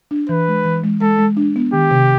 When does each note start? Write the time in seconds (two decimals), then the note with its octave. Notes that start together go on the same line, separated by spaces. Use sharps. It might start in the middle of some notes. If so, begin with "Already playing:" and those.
0.11 D4
0.29 E3 B4
0.48 G#3
0.65 E3
0.84 G#3
1.01 G#3 A4
1.19 G#3
1.37 D4
1.56 B3
1.73 D#3 G4
1.91 C3